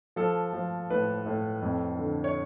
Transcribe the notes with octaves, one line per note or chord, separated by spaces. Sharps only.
F3 A4
F3
A2 B4
A2
F2
D3
C#5